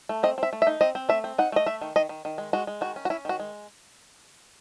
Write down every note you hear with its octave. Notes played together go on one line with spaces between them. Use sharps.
A3
C4 D#5
C4 E5
A3
E5
D#4
C4 D#5
C4
A3 E5
C4
D#4 F#5
A3 D#5
A3 E5
D#3
D#3 D#5
D#3
D#3
G#3
G#3 F#4
G#3
D#3 F#4
C#4
F#4
C#4 E4
D#3 F#4
G#3